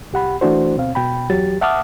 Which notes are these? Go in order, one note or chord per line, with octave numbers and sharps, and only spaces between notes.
C2 G4 F#5 B5
E3 A3 D4 F#4 C5
D2 B2 C4 F5
B2 G5 B5
E2 F#3 G4 A6
E5 F#5 A5 D6 D#6 F6